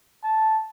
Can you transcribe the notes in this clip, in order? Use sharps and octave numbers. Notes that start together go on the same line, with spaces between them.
A5